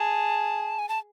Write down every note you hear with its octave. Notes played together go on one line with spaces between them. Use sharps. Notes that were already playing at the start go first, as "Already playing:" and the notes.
Already playing: G#4 A5
G#5
A5